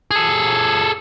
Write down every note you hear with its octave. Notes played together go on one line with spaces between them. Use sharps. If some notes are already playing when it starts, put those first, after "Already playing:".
G#4 A4